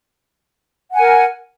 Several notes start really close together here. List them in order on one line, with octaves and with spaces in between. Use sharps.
F#5 G#5 A#4